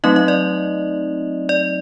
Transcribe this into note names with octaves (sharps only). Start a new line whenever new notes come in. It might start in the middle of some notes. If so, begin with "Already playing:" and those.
F#3 A3 C4 D#4 D#5
D#5
D5
D5